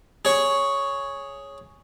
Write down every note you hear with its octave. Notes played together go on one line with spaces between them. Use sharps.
G#4 C#5 C#6